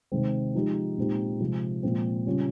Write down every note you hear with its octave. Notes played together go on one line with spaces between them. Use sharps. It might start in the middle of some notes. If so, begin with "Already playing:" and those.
C3 D#3 G#3 C4
F3 G#3 D#4 G4
A#2 G#3 C4 D#4 G4
C3 F3 G#3
A#2 F3 G#3 C4
C#3 G3 C#4 F4